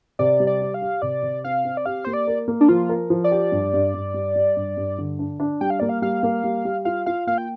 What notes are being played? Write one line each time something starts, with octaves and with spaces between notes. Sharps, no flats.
C3 D5
G3
D5
G4
F5
G4
C3 D5
C3
C4 F5
C4
D5
G4 F5
A#3 C5
D5
A#4
A#3
D4
F3 F4
A#4
F3
D5
G4
G2
G2
G2
G3
G3
G2
G2
D3
D4
D4
G3 G5
F5
A#3 D5
F5
G3 F5
A#3
G3
G3
F4 F5
F4 F5
A#3 F5
G5